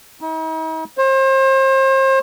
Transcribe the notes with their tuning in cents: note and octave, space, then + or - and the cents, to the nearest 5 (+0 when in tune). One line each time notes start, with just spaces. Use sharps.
D#4 +45
C5 +35